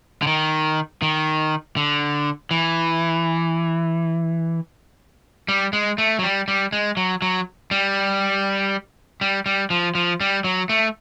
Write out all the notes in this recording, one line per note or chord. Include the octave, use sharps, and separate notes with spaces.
D3
D#3
D#3
D3
E3
G3
G#3
A3
F#3
G3
G3
G#3
F#3
F#3
G3
G3
G3
F3
F3
G3
F#3
A3